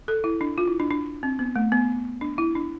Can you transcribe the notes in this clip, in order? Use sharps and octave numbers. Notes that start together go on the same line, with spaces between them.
A4
E4
D4
F4
E4
D4
D4
C4
B3
A3
B3
D4
E4
D4